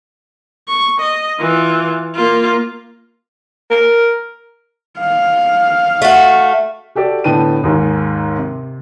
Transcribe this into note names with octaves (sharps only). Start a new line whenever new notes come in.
C#6
D#5
E3 F4
A#3 F4
A#4
F5
A3 F#4
F#4 G4 A4 D5
A2 D3 B3 G5 A5 D#7
D#2 G#2
C3